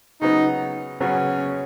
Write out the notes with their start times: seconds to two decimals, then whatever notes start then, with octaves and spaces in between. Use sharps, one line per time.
0.21 C#3 F#3 B3 D#4
1.00 C#3 F#3 B3 C#4